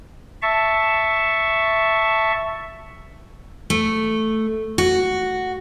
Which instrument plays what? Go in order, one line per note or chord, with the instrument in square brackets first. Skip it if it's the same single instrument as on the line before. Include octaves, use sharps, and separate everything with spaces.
[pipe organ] E5 A5 C#6
[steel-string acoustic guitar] A3
F#4